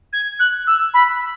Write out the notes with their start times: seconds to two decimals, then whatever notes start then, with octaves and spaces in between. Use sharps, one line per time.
0.13 G#6
0.40 F#6
0.67 E6
0.94 B5